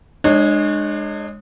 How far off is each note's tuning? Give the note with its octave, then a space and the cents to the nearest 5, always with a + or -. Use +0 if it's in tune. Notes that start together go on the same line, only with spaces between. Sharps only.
G#3 +0 D4 +35 C#5 -15